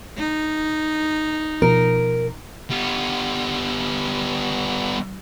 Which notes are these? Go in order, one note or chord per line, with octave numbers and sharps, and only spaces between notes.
D#4
B2 F3 A#4
G3 B3